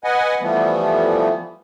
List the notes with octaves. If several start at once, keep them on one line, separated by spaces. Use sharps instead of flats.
B4 D#5 F#5 G#5
E3 F3 G3 A3 B3